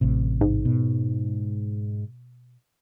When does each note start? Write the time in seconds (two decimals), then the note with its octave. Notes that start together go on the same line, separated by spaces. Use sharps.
0.01 A1 A2 C3
0.41 G#2
0.65 B2